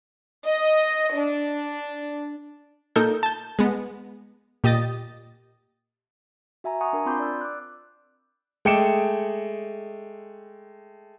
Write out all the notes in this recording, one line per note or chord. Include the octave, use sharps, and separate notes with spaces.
D#5
D4
A#2 D#4 A4 A#4 G6
A5 G6
G#3 B3
A#2 G4 D#5 D#6 A6
F#4 E5 G#5 A#5
F#5 G#5 A#5 C#6 D#6
D4 A#4
C4 F4 B5 C6 D6 G6
D5 E6
D6 F#6
G#3 A3 G5 D6 C#7 E7